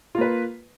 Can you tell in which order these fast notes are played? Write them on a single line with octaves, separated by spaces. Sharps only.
F4 A#3 B4